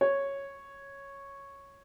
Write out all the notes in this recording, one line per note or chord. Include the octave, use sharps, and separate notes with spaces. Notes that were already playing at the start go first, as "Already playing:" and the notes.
C#5